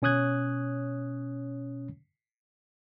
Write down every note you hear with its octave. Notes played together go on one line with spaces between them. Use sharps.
B2 C#4 C#5 D#6 F#6 G#6